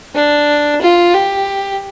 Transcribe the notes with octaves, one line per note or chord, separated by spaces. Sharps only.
D4
F4
G4